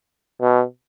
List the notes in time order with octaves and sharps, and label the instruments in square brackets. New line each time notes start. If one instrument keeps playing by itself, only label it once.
[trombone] B2